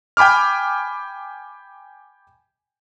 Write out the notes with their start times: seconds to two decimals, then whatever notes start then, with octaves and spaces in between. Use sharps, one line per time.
0.17 G5 G#5 B5 D6 F6